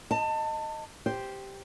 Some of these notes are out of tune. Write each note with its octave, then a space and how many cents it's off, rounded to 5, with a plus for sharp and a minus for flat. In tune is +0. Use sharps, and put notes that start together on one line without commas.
D#5 +0 A5 +30
G4 +0 C5 +0